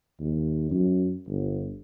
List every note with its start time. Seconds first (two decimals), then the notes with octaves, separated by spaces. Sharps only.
0.20 D#2
0.71 F#2
1.28 G1